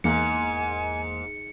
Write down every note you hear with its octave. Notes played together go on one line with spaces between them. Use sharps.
E2 G#2 A#3 G#5 C#7